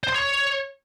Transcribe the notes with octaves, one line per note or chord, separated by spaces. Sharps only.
C5
C6
C#5